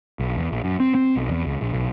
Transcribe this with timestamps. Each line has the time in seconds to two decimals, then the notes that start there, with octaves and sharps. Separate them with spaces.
0.19 B1
0.36 E2
0.52 A#1
0.64 F#2
0.80 C4
0.95 C4
1.16 B1
1.29 E2
1.46 C#2
1.61 A#1
1.74 B1